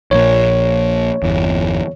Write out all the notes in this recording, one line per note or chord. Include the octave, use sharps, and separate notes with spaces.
A#1 A#2 C#5
G1 E2